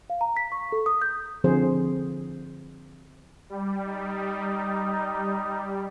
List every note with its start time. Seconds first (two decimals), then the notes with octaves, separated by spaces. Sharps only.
0.10 F5
0.21 A#5
0.37 B6
0.52 C#6
0.72 A4
0.86 D#6
1.02 G6
1.44 D3 F3 C4 G#4 C5
3.50 G3
3.86 D#4